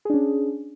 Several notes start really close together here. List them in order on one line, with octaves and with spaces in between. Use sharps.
G#4 D4 C#4